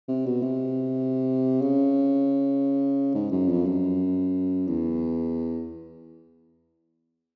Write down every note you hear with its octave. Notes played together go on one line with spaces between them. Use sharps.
C3
B2
C3
C#3
G#2
F#2
F2
F#2
E2